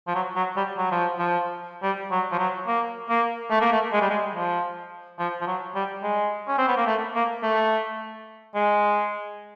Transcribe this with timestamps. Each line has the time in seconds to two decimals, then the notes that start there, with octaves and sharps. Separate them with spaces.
0.07 F3
0.15 F#3
0.36 F#3
0.57 G3
0.78 F#3
0.91 F3
1.19 F3
1.83 G3
2.11 F#3
2.32 F3
2.39 F#3
2.67 A#3
3.09 A#3
3.51 A3
3.61 A#3
3.72 A3
3.93 G#3
4.02 G3
4.10 G#3
4.35 F3
5.19 F3
5.41 F3
5.47 F#3
5.75 G3
6.03 G#3
6.48 C#4
6.58 C4
6.68 B3
6.77 A#3
6.87 A3
7.15 A#3
7.43 A3
8.55 G#3